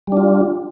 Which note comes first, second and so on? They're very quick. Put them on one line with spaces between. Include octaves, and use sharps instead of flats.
G3 D4 F4